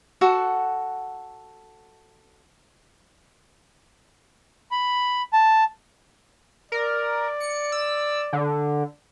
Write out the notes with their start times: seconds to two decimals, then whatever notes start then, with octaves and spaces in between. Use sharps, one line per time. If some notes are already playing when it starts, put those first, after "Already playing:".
0.21 F#4 A4 F#5
4.71 B5
5.33 A5
6.72 A#4 D5
7.40 C#7
7.72 E6
8.33 D3